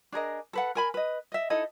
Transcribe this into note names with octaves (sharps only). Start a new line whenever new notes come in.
D4 G#4 A#4 D#5
A4 B4 F#5
A#4 G#5 B5
B4 D#5
D#5 E5
D#4 E4 A4 D#5